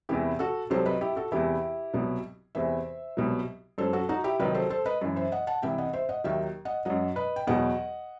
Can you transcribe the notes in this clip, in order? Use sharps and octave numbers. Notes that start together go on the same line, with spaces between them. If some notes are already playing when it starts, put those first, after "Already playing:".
E2 C3 E3 E4 G4
F#4 A4
C2 C3 F#3 A4 C5
B4 D#5
E4 G4
F#4 A4
E2 C3 E3 E4 G4
C2 B2 F#3
E2 C3 E3 C5 E5
C2 B2 F#3
F#2 F#3 A4 C5
F#4 A4
D#4 F#4
E4 G4
C2 C3 D#3 F#3 B4 D#5
A4 C5
A4 C5
B4 D#5
F#2 E3
C5 E5
D#5 F#5
F#5 A5
C2 C3 E3 E5 G5
D#5 F#5
C5 E5
D#5 F#5
D#2 D#3 F#3 E5 G5
D#5 F#5
F#2 F#3 D#5 F#5
B4 D#5
G5
E2 B2 F#3 D#5 F#5